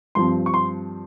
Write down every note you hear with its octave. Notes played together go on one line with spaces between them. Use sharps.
G2 F3 C4 C6
C#6
C6